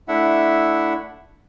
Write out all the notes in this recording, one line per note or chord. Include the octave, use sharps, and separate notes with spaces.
A3 D4 E4 E5 F#5